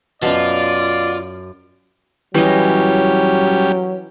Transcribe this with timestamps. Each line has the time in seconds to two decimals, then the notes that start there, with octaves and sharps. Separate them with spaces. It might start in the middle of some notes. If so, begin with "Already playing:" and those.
0.22 F#2 B2 F4 D5 A5
2.34 E3 F#3 G3 C#4 G4 D#5